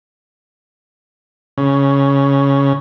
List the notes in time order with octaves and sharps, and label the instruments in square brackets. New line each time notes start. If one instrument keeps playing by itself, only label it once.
[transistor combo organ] C#3